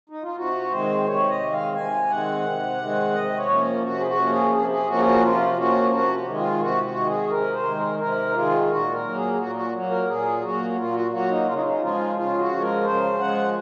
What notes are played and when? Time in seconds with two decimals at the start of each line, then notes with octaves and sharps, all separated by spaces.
0.09 D#4
0.23 F4
0.36 C3 F#4
0.71 D#3 G#3 C4 C5
1.06 C3 C#5
1.29 D#5
1.40 D#3 G#3 C4
1.52 F5
1.75 C3 G#5
2.10 D#3 G#3 C4 F#5
2.45 C3
2.80 D#3 G#3 C4
3.14 C3 D#5
3.37 C#5
3.49 F3 A#3 C#4
3.83 C3 F#4
3.99 G#4
4.06 F#4
4.18 F3 A#3 C#4
4.30 G#4
4.53 C3 G#4
4.70 G#4
4.87 F3 A#3 C#4 F#4
4.98 G#4
5.05 F#4
5.22 C3 F4
5.56 F3 A#3 C#4 F#4
5.91 C3 F#4
6.26 D#3 G#3
6.37 F4
6.60 C3 F#4
6.83 F#4
6.95 D#3 G#3
7.07 G#4
7.30 C3 A#4
7.53 C5
7.65 D#3 G#3
7.76 A#4
7.99 C3 A#4
8.29 D#4
8.34 D#3 G#3 F4
8.69 A#2 F#4
8.92 A#4
9.03 F#3 A#3
9.15 G#4
9.34 G#4
9.38 A#2 F#4
9.55 F#4
9.73 F#3 A#3
9.91 A#4
10.07 A#2 G#4
10.42 F#3 A#3 F#4
10.70 F#4
10.77 A#2 F4
10.95 F#4
11.11 F#3 A#3 F#4
11.29 D#4
11.46 C#3 F4
11.54 D#4
11.70 D#4
11.81 F3 G#3 F4
12.15 C#3 F4
12.38 F#4
12.50 F3 G#3
12.61 A#4
12.84 C#3 C5
13.19 F3 G#3 F#5